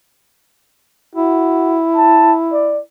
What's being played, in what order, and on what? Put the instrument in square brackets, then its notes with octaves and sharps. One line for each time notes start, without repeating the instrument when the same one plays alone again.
[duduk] E4 [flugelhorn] F#4
[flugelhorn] A5
D5